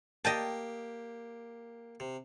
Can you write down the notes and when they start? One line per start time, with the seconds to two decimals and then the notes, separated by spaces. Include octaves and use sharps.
0.25 A#3 G4 D#5 G5 A5
2.00 C3